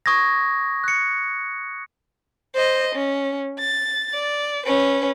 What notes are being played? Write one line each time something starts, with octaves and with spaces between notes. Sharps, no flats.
C#6 D#6 G#6 A#6
F#6 C#7
C5 D#5
C#4
A6
D5
C#4 B4